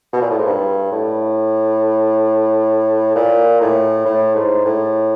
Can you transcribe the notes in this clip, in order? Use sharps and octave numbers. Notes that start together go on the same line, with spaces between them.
B2
A#2
A2
G#2
G2
A2
A#2
A2
A2
G#2
A2